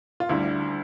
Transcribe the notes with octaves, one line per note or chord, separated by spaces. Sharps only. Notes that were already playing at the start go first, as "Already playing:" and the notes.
F4
D2 D3 G3 E4